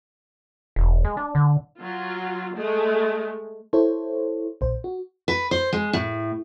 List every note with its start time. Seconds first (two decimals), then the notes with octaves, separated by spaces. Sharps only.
0.76 E1
1.05 G#3
1.17 D4
1.35 D3
1.80 F#3 F4
2.56 G#3 A3
3.73 E4 A4 C5 C#5
4.61 A#1 C5
4.84 F#4
5.28 B4
5.51 C5
5.73 G#3
5.93 A2